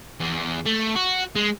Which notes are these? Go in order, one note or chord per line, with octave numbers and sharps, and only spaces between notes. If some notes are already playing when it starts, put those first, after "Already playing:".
E2
A3
F#4
G#3